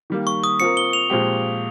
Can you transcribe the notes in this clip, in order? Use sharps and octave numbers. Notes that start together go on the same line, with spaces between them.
D#3 G3 A#3
C#6
D#6
C4 F4 A#4 C#7
G7
F7
A#2 F3 G#3 C4 G4